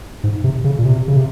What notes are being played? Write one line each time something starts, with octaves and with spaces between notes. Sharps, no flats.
G#2
C3
C#3
A#2
C3
C#3
C3